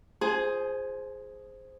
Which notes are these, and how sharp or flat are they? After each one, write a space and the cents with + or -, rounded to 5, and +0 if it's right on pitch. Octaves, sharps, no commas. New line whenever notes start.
G#4 +0 C5 +0 G#5 +45